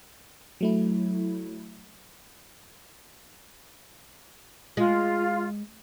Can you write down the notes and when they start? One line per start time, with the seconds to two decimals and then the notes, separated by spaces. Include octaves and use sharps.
0.61 F#3 A3 E4
4.77 G#3 F4